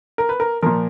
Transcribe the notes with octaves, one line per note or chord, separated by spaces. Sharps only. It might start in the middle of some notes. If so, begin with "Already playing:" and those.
A#4
B4
A#4
A#2 F3 A#4